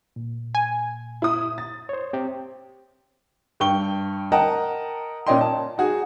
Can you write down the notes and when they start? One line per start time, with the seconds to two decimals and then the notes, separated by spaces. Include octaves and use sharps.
0.16 A#2
0.55 G#5
1.22 E4 D#6
1.58 A6
1.89 C5 C#5
2.13 C4 G4
3.60 G2 G5 C#6 G7
4.32 A#4 D#5 F#5 G5 A5 A#5
5.27 A#2 C#4 D5 D#5 G5 C6
5.41 A5
5.78 D#4 F#4 G#4